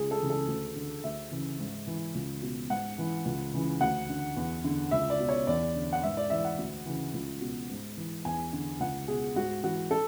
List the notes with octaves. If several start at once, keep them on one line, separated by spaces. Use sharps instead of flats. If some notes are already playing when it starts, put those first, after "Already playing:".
Already playing: C#2 G#4
A4
C#3 E3
A4
D2
D3
D2 E5
C#3 E3
G#2
E3
C#2
B2
G#2 F#5
E3
C#2
C#3 E3
D2 F#5
D3
E2
D3
C#2 E5
D5
B2
C#5
E2 D5
D3
F#5
G#2 E5
D5
E3 E5
F#5
D2
C#3 E3
C#2
B2
G#2
E3
E2 G#5
D3
C#2 F#5
B2 G#4
G#2 F#4
E3 F#4
A4